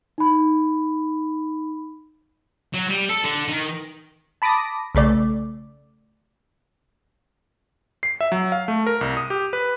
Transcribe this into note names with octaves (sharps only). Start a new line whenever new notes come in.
D#4 B5
F#3
G3
A4
D3
D#3
A5 B5 D6 D#6 A#6
B1 C#3 A3 D5
C7
E5
F#3
F5
A3
A#4
C2
D#6
G4
B4